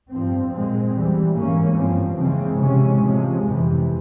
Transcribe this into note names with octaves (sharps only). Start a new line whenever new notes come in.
G2 F3 C4
A#2 G#3 C4
E2 E3 G3
G#2 E3 A#3 C#4
G2 F3 C4
C#3 E3 G#3 C4
C3 E3 G#3 C#4
C3 F3 G#3
F2 C3 E3